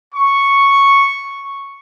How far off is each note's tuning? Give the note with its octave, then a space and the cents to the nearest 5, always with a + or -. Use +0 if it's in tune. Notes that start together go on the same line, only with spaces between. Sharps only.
C#6 +0